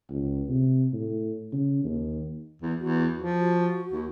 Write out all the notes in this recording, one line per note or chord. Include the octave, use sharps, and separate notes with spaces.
C#2
C3
A2
C#3
D#2
E2
E2 F#4
F3
F#4
D#2